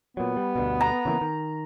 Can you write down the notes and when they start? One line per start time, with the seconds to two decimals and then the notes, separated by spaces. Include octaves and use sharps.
0.17 A#2 F#3 B3
0.37 G3
0.56 D2 G2 B2
0.81 A#5
1.05 C#3 E3 A#3
1.21 D#3